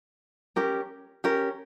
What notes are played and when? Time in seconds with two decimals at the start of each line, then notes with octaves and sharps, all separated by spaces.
0.56 C#4 G4 A#4
1.24 C#4 G4 A#4